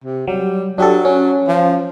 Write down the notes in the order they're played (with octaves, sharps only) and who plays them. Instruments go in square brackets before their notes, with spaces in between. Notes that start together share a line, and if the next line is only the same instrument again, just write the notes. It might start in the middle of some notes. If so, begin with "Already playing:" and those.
[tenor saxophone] C3
[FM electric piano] F#3 [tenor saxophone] G3
[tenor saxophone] F#3 [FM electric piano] D4 G4 A4
[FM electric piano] C#4
[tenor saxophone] F3